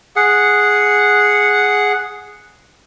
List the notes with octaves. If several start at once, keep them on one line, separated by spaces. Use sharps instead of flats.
G#4 F#5